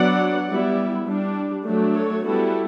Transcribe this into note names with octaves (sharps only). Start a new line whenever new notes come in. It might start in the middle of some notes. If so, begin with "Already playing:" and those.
Already playing: F#3 B3 D4 D5 F#5
G3 B3 E4
G3 D4
F#3 A3 D4
A4 C#5
G3 B3 E4 F#4 A4